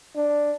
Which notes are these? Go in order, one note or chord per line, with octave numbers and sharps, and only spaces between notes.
D4